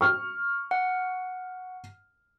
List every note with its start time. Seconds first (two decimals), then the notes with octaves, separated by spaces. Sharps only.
0.01 C#6 F6
0.71 F#5